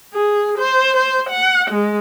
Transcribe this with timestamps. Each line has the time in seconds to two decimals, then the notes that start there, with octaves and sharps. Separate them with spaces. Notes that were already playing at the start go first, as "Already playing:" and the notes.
0.14 G#4
0.58 C5
0.97 C5
1.29 F#5
1.70 G#3